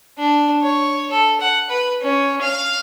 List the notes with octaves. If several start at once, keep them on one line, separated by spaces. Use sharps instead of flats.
D4
C#5
A4
F#5
B4
C#4
F5